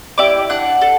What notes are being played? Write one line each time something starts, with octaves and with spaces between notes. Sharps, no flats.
E4 G4 D5 D6
D4 F#5 F#6
A4